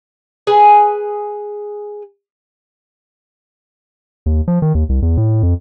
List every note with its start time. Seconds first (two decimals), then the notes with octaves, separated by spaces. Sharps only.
0.47 G#4 B4 G#5
4.26 D#2
4.48 F3
4.62 D#3
4.75 D#2
4.89 C2
5.02 E2
5.17 A2
5.43 F2